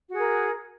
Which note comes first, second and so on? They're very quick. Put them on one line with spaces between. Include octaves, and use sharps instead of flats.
F#4 G#4 A#4